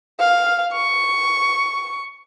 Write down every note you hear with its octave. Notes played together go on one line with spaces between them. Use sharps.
F5
C#6